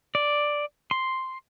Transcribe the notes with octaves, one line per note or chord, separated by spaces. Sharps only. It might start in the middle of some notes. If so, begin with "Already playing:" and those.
D5
C6